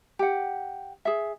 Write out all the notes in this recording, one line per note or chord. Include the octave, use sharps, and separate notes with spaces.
G4 F#5
G#4 E5